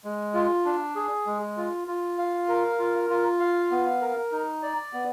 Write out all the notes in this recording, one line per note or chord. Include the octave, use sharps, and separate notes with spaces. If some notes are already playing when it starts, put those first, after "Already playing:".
G#3
F4
D4
G#4
G#3
F4
F4
F5
A#4
F4
F4
F5
B3
A#4
D#4
D5
B3